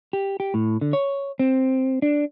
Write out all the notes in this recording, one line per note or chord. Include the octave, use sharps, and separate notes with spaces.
G4
G4
A2
D3
C#5
C4
D4